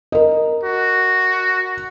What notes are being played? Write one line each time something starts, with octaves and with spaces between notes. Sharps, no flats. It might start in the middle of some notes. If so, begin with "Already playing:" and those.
A#4 D#5
F#4